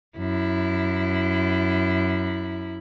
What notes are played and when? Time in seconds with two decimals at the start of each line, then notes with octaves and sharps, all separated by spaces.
0.17 F#2 E4